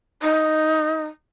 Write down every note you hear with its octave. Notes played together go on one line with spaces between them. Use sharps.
D#4